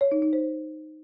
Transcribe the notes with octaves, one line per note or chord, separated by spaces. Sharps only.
C#5
D#4
D#4
C5